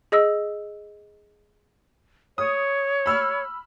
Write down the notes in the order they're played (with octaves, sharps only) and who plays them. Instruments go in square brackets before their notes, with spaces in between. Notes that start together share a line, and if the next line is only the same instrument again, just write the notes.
[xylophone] G#4 D#5 E6
[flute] C#5 [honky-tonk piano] D#6
[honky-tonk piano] B5 E6 F6